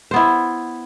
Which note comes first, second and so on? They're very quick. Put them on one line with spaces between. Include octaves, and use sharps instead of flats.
C5 B3 E4